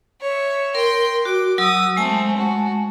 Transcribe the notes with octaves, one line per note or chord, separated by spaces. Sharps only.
C#5 E5
A#4 G5 C6
F#4 D6
F#3 D#6 E6
G#3 A3 C4 G#5 A5
F#4